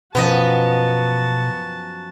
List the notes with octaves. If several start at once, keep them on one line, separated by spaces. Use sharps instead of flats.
F#2 B2 F3 B3 F#4 D#5 A5